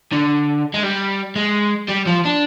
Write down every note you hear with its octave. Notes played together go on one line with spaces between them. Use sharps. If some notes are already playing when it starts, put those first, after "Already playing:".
D3
G#3
G3
G#3
G3
F3
D4